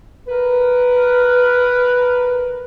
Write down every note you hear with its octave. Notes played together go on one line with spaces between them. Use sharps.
A#4 B4